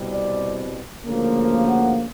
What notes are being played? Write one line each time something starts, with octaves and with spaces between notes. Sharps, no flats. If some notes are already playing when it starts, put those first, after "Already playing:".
Already playing: C2 B2 G3 C4
D5
D2 C#3 F3 A#3
F5
F#5